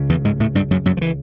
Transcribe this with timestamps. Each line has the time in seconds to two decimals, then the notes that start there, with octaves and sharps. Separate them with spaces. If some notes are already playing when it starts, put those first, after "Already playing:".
Already playing: C#2 C#3
0.09 E2 E3
0.25 G#2 G#3
0.40 A2 A3
0.55 G2 G3
0.71 F#2 F#3
0.86 F#2 F#3
0.97 F3
1.01 E3